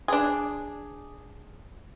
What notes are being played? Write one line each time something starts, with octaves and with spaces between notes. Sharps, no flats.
D4 G#4